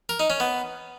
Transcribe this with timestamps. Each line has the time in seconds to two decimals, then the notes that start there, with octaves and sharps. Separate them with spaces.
0.09 A#4
0.20 D#4
0.30 C#4
0.40 B3